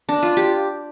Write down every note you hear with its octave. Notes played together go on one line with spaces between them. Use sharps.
D4
F4
G4